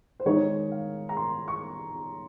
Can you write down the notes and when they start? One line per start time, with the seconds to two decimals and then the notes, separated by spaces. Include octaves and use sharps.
0.20 C5
0.26 D#3 G#3 D#4 C#5
0.71 F5
1.09 A#5
1.17 C6
1.48 C#6